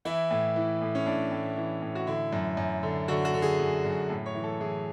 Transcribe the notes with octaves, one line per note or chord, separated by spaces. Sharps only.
E3 E4
A2
E3
A2
C#4
A2 D4
A2
E3
A2
F#4
D3 E4
F#2
F#2
D3
D3 F#4
F#4
D3
G#4
F#2
F#2
A2 A4
C#5
E3
A4
E3 G#4